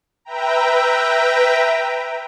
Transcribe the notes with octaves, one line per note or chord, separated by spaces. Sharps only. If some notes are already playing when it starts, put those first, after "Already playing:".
B4 E5 G5 A#5